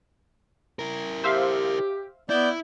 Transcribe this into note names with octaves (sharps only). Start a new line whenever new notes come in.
E4 A#4
G4 C5 E5 F5
B3 E4 D5 G6